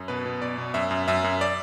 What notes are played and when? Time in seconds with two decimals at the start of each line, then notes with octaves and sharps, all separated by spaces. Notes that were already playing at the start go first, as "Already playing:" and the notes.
Already playing: F#2
0.08 B2 B4
0.26 B2
0.42 B2 D5
0.58 B2
0.74 F#2 E5
0.91 F#2
1.08 F#2 E5
1.24 F#2
1.41 D5